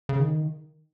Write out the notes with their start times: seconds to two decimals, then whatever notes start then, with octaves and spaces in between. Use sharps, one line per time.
0.09 C#3
0.19 D#3